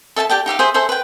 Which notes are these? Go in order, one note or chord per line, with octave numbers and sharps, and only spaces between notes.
A4 E5 G#5 A5
G4 D5 G5 A5
D#4 G4 E5 F5
G#4 C5 E5
G#4 A4 C5 E5
B4 G5